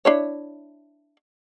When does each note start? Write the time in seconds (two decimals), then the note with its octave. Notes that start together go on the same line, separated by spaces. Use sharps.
0.05 D4 E4 C#5